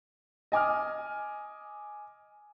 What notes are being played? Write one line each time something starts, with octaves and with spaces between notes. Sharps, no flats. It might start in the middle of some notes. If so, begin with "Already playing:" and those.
D#5 G#5 D6 F6